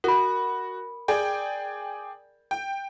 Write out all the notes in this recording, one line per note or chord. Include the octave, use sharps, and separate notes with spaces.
F#4 A#4 B5
G#4 D5 G5
G5